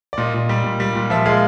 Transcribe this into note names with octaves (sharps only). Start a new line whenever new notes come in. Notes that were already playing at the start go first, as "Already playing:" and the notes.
D5
A#2 D#5
A#2
G3
A#2
G3
A#2
F3 E5
G#3 F5